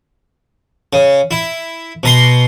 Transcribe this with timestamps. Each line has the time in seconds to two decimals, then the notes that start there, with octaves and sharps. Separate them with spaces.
0.93 C#3
1.31 E4
2.03 B2 A#5 C6